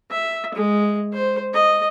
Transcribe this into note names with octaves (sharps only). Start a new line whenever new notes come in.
E5
G#3
C5
D#5